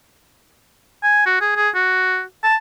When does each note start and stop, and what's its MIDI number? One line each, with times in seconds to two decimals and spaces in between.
1.04 1.25 80
1.26 1.40 66
1.41 1.56 68
1.56 1.69 68
1.75 2.22 66
2.43 2.56 81